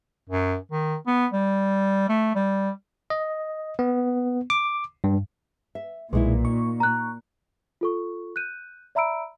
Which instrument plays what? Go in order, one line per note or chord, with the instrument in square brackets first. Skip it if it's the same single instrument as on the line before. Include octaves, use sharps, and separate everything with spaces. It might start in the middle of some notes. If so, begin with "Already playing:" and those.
[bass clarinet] F#2
D#3
B3
G3
A3
G3
[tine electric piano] D#5
B3
D6
G2
[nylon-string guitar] E5
[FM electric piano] B1 [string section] A#2 [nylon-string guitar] G#3 D#4 E4
[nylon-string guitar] D#4 [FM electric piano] C#6
[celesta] A#5 F#6
F4 A4 C#6
F#6 G6 D#7
D5 E5 A#5 B5 E6 D7